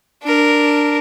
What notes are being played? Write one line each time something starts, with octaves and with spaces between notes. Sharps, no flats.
D4 A#4